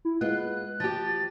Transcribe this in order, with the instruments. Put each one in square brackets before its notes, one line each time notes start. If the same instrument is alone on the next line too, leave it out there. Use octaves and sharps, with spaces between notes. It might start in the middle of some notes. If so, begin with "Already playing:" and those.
[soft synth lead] E4
[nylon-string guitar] G#3 B3 F4 [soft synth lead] F#6
[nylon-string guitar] F3 G4 [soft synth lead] A6